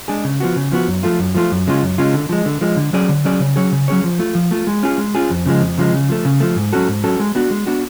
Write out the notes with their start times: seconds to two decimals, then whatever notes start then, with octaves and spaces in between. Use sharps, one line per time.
0.08 G#3 D4 G#4
0.24 C#3
0.40 F3 B3 F#4
0.56 C#3
0.72 F3 B3 F#4
0.88 F#2
1.03 F3 A3 F4
1.19 F#2
1.35 F3 A3 F4
1.51 F#2
1.67 C#3 G#3 C#4 F4
1.82 F#2
1.98 C#3 G#3 C#4 F4
2.13 D3
2.29 F3 G#3
2.46 D3
2.61 F3 G#3
2.76 D3
2.93 F#3 C#4 G#4 D5
3.09 D3
3.25 F#3 C#4 G#4 D5
3.40 C#3
3.56 F#3 C#4 G#4 C#5
3.72 C#3
3.88 F#3 C#4 G#4 C#5
4.04 F3
4.19 A3 F4
4.35 F3
4.51 A3 F4
4.67 G#3
4.83 C#4 F4 G#4
4.98 G#3
5.15 C#4 F4 G#4
5.30 F2
5.46 C#3 F3 G#3
5.61 F2
5.78 C#3 F3 G#3
5.93 C#3
6.09 F3 A3
6.25 C#3
6.40 F3 A3
6.56 G#2
6.73 F#3 C#4 F#4 A4
6.88 G#2
7.04 F#3 C#4 F#4 A4
7.20 G#3
7.35 B3 D4 F#4
7.51 G#3
7.67 B3 D4 F#4